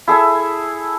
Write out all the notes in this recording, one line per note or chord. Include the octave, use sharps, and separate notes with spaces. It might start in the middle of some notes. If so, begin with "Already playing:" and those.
E4 G#4 A4 E5